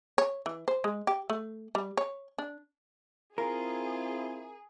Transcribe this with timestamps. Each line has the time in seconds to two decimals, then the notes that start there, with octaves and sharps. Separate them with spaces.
0.18 C#5
0.46 E3
0.68 C5
0.84 G#3
1.07 G4
1.30 A3
1.75 G3
1.97 C#5
2.38 D4
3.38 C4 E4 F4 G#4 A#4